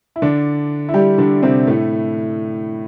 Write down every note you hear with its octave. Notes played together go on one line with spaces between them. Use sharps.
E4
D3 D4
E4
G3 G4
D3 D4
C3 C4
A2 A3